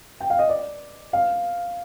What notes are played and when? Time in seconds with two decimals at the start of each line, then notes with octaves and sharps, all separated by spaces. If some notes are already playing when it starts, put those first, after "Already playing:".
0.20 G5
0.30 F5
0.39 D#5
0.49 D5
1.13 F5